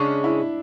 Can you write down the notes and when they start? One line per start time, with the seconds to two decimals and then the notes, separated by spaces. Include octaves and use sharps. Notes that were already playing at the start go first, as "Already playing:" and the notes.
Already playing: C#3 G#3 C#4 D4
0.24 E4